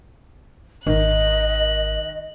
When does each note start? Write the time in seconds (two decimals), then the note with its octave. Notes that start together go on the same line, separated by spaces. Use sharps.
0.87 G#1 D#3 D#5 F#6